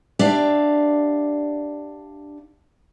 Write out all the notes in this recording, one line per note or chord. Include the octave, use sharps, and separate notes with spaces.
D4 G4 D5 E5 F5